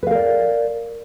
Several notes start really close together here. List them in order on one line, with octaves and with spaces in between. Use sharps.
B4 F5 A#4 D5